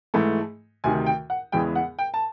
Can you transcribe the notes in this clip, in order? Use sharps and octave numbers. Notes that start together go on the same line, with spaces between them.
G#2 E3 A3
D2 C3 D#3 G#5
G5
F#5
E2 C#3 E3 G#3 G5
F#5
G5
A5